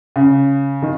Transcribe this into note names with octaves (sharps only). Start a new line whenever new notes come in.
C#3
D#3